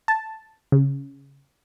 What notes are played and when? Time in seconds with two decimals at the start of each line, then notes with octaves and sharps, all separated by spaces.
0.08 A5
0.72 C#3